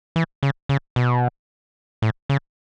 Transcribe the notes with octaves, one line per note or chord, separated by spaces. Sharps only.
E3
C#3
C#3
B2
A2
C#3